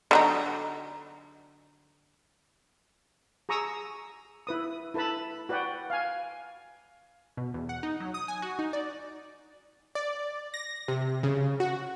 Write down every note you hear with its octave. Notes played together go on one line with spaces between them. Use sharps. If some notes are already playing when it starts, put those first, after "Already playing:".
D3 F#3 D#4
G#4 A#5 C#6 D#6 E6
E4 B4 D#6
E4 A4 B4 A5 B5
F#4 B4 D5 F#5 G5
F5 G#5
B2
E2
F#5
D#4
F#3
D#6
G#5
F#4
D#4
D5
D5
A#6
C3
C#3
F#4